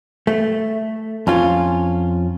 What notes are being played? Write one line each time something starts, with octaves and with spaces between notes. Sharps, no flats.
A3
F2 C#4 F4